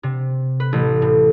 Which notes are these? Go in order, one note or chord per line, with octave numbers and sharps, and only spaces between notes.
C3
B4
A1
A2